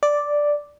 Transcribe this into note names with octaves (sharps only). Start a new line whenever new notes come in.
D5